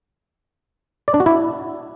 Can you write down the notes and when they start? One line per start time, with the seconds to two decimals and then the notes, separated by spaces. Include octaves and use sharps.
1.08 D5
1.14 D4
1.20 F#4
1.26 E4